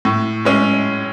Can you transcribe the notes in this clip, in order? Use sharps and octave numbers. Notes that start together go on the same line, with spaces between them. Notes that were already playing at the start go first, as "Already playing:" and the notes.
A2
G#3 C#4 G#4